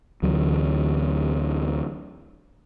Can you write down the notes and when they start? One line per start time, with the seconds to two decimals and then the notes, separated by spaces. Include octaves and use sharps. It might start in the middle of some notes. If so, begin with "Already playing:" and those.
0.23 D2 E3 F#3